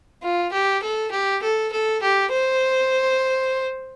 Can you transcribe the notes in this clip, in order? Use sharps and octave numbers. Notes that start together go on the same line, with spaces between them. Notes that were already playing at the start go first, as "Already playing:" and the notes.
F4
G4
A4
G4
A4
A4
G4
C5